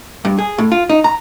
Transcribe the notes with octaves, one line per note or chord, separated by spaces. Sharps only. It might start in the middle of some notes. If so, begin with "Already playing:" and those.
G2
G#4
A2
F4
D#4
A#5